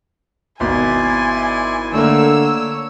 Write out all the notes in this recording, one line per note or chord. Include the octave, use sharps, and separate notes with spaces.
G#1 B2 E4 D5 G#5 C6
D3 A3 A#3 C#5 E6